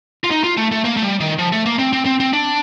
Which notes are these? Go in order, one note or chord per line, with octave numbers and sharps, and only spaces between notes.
F4
D#4
F4
A3
A3
A#3
A3
G3
D#3
F3
A3
A#3
C4
C4
C4
C4
D4